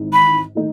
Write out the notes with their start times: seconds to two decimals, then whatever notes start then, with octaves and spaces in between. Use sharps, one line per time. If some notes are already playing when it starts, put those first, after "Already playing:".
Already playing: G#1 G#2 E3
0.13 B5
0.55 D#3 A3 D#4